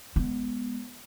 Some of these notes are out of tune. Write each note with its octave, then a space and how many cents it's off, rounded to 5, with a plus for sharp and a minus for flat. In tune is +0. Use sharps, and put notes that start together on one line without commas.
G#3 +0 B3 +0